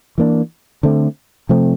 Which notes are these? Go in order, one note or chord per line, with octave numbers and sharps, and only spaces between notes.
E3 A#3 D4
D3 A3 C4
C3 F3 A3 C4